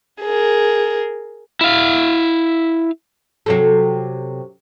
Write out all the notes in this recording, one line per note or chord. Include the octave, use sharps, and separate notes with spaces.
G#4 A#4
E4 F5
C3 F#3 A4